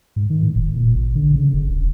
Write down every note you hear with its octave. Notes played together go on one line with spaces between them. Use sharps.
G#2
D#3
A2
F1
A#2
A1
D3
C#3
F#1
D#1